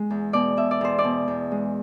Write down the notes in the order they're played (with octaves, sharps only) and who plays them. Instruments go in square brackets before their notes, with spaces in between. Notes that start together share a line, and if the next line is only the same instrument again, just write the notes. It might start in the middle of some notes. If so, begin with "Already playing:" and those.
Already playing: [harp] G#3
E2
B2 D5
B2 E5
D5
E2 C5
D5
B2
E2
G#3